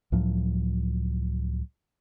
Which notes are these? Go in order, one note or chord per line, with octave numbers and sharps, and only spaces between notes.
C#2 A2 F3 F#3